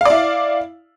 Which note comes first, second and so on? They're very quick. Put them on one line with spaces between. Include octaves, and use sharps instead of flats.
F5 D5 E4